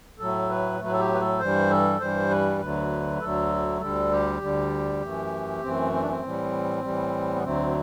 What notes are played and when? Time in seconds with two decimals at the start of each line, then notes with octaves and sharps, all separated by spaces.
0.19 A2 F#3 A3 A4
0.49 B4
0.80 A2 F#3 A3 B4
0.93 A4
0.99 G4
1.14 B4
1.20 A4
1.40 G2 E3 G3 C5
1.70 A4
2.00 G2 E3 G3 C5
2.30 B4
2.60 D2 D3 F#3 A3 B4
3.21 D2 D3 F#3 A3 A4
3.81 D2 D3 G3 A4
4.11 G4
4.42 D2 D3 G3
5.02 F#2 E3 A3
5.62 F#2 E3 A3 C4
5.92 C4
6.01 D4
6.09 C4
6.23 A2 E3 G3
6.83 A2 E3 G3
7.36 B3
7.43 D2 D3 F#3 A3 C4